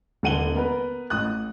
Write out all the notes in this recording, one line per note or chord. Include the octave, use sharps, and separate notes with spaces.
D#1 D3 F#5 D#7 F#7 G7
B3 A#4 B4
A1 D#6 F#6